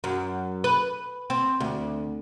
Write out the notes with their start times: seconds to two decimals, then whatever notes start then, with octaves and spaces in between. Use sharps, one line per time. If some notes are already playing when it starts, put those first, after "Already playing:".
0.04 F#2
0.64 B4
1.30 C4
1.60 D2